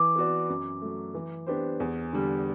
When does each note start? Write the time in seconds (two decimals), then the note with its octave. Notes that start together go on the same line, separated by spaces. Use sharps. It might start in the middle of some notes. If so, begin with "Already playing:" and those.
Already playing: E3 D6
0.16 B3 F#4 B4 D5
0.49 F#2
0.82 F#3 A3
1.14 E3
1.46 B3 D4 G4 C5
1.80 E2
2.13 D3 G3